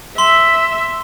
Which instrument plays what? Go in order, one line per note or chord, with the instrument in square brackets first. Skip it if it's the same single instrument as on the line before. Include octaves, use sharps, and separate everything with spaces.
[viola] E5 [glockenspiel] C6 G7